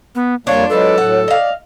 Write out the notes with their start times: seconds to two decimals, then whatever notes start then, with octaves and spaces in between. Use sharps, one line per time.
0.15 B3
0.47 F2 G3 A#3 D4 F4 C#5
0.69 F#3 G#3 A4 B4
0.98 A2 F#3 F#5
1.28 D5 D#5 F5